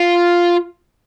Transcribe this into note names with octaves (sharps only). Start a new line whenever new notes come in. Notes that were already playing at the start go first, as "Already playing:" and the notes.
Already playing: F4